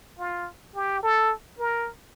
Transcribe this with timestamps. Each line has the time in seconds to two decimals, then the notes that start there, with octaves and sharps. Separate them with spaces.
0.19 F4
0.75 G4
1.03 A4
1.59 A#4